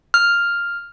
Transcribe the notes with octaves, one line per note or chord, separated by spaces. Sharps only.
F6